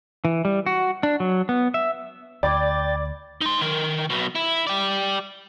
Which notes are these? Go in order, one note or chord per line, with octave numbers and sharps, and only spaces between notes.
E3
G3
F#4
D4
F#3
B3
E5
D2 D5 G5 B5 D6 G#6 A6
D#4 C6
D#3 A#4
B1 B2
E4
G4 D5